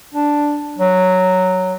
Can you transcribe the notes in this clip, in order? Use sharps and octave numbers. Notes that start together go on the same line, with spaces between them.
D4
F#3